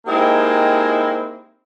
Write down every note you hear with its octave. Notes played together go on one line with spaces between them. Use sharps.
G#3 A#3 C4 D#4 E4 G4